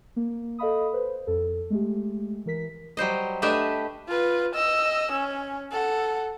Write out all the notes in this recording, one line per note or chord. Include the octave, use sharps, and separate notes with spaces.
A#3
A4 D#5 F5 B5 D#6
B4 C5
F2 A4
G#3 A3 G4
E3 A#4 B6
F#3 G3 C5 D#5
A3 D4 G4 B4 D#5 E5
F4 B4
D#5 E6
C#4
A4 F#5